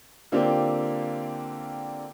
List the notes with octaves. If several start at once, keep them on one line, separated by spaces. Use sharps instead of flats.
D3 A#3 C4 D4 F4 G4